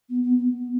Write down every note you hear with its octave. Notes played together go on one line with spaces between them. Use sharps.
B3
B3
B3
B3